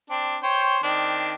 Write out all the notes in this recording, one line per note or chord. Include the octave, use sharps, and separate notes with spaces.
C4 D4
C5 C#5 G5
D#3 C4 D4